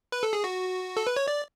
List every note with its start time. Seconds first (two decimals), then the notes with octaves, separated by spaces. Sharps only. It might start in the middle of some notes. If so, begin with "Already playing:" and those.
0.12 B4
0.23 A4
0.33 G#4
0.44 F#4
0.97 A4
1.07 B4
1.16 C#5
1.28 D5